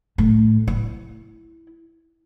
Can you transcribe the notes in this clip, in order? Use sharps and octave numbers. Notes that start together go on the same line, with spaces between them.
A2
E4